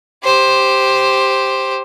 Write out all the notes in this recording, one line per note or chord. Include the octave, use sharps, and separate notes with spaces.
G4 C5